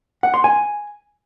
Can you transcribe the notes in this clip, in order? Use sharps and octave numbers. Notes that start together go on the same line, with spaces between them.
F#5
C6
G#5